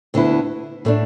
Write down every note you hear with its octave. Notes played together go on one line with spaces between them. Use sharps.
D2 D3 B3 E4
A2 A3 D4